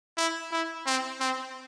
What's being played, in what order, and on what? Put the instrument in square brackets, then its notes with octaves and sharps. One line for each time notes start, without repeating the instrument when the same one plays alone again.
[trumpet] E4
E4
C4
C4